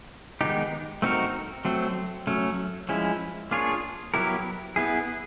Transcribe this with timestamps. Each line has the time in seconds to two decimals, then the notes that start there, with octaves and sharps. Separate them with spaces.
0.41 D#3 G#3 B3 D#4 G4
1.02 A3 C4 D#4 F#4 A#4
1.65 F#3 A3 C4
2.27 F#3 A3 C#4
2.89 F3 G#3 C#4 E4
3.51 A#3 D4 F4 G#4 C#5
4.14 F#3 B3 E4 G4 A#4
4.76 B3 E4 G#4